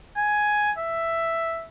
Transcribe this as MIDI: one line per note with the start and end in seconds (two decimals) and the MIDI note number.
0.18 0.73 80
0.78 1.67 76